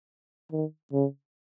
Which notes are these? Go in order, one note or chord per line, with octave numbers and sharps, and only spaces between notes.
D#3
C#3